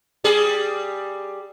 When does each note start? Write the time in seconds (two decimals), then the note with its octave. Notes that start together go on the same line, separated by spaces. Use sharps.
0.24 G3 G#4